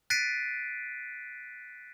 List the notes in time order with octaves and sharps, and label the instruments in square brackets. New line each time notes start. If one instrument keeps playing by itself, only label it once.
[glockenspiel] F#6 A6 B6 C7 D7 D#7